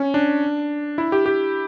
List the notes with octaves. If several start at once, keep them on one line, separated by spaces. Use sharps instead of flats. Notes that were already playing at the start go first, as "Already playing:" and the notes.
Already playing: C#4
D4
E4
G4
G4